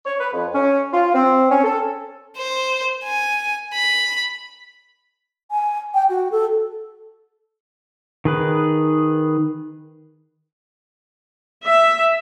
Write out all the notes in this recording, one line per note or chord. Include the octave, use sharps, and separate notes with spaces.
C#5
B4
F2
C#4
F4
C4
C#4
A4
C5
G#5
B5
G#5
G5
F#4
A4
D#3 G#4 B4
E5